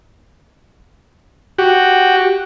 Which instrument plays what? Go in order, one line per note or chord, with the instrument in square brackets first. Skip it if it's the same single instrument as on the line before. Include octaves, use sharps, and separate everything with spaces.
[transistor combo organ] F#4 G4